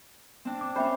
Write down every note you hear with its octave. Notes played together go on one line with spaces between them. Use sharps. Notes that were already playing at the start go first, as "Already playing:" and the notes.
C4 D4
D6
C#4 C5 E5 G5 B5